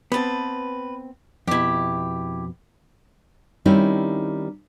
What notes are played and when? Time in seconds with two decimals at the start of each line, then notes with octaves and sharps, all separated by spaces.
0.12 B3 C4 B4 A5
1.47 F2 B2 E4 G4
3.65 D#3 G3 C4 C#4 D#4 E4